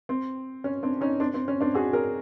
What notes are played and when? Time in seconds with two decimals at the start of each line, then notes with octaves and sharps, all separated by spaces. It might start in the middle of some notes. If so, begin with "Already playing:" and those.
0.09 C4
0.64 C#4
0.83 C4 D4
1.01 C#4 D#4
1.20 C4 D4
1.34 C4
1.48 C#4
1.61 C4 D4
1.74 F#4 G#4
1.93 G#4 A#4